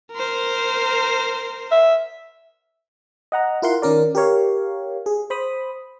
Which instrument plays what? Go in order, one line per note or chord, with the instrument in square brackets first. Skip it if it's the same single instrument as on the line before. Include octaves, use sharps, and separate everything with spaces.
[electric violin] A#4 C5
[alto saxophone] E5
[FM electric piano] D#5 F#5 A#5
E4 F4 A#4 F#5 C6
D#3 C#4 A#4 D5
G4 A#4 C#5 F5
G#4
C5 B5 D#6